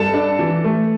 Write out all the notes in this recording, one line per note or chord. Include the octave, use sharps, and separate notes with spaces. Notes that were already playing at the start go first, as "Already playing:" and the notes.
Already playing: G2 A4 A5
D4
E3
A3